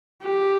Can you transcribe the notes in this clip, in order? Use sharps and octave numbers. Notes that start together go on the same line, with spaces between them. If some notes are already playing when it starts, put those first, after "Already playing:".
G4